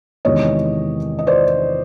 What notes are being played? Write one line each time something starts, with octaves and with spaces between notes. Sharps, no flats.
E2 C3 D#3 G#3 C#5 D#5
D#5
C5 D5